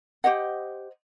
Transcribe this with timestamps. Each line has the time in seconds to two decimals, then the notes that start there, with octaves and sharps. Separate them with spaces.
0.24 G4 C5 D#5 F#5